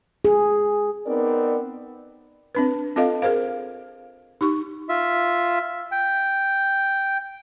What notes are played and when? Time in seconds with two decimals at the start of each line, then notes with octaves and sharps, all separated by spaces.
0.25 G#4
1.06 B3 C4 D#4 A#4 D5
2.55 C4 D4 B4
2.96 C4 F4 A4 D#5 F5
3.22 G#4 A#4 C5 F5
4.41 D#4 G4 C#6
4.89 F4 E5
5.92 G5